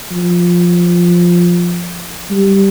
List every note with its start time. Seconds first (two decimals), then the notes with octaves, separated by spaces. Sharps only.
0.11 F3
2.31 G3